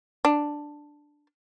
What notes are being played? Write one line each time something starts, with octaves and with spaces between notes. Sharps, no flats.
D4